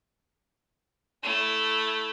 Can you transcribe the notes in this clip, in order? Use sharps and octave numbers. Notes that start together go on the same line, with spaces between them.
A3 E4